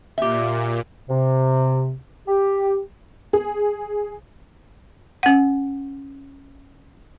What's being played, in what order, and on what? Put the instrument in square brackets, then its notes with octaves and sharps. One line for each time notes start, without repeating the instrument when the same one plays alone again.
[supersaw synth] A#2 [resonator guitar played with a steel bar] G4 E5
[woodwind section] C3
G4
[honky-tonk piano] G#4
[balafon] C#4 F#5